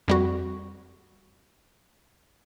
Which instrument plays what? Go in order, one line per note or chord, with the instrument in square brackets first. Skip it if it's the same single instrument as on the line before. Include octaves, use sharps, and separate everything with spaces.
[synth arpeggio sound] F2 G3 F#4